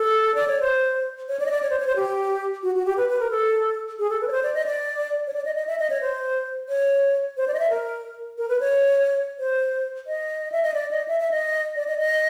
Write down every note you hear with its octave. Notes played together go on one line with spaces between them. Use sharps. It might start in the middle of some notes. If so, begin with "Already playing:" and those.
Already playing: A4
D5
C#5
C5
C#5
D5
D#5
D5
C#5
C5
C#5
C5
G4
F#4
F#4
G4
B4
B4
A#4
A4
G#4
A4
B4
C#5
C5
D5
D#5
D5
C#5
D5
D#5
D#5
E5
D#5
C#5
C5
C#5
C5
D5
D#5
E5
A#4
A#4
B4
C#5
C5
D#5
E5
D#5
D5
D#5
E5
E5
D#5
D5
D#5
D#5